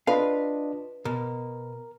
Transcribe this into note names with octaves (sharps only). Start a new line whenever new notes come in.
D4 F4 B4 D#5 F5
B2 A#4